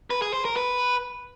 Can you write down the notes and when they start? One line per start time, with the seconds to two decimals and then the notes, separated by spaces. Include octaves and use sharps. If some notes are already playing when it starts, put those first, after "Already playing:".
0.10 B4
0.22 G#4
0.33 C5
0.45 A#4
0.57 B4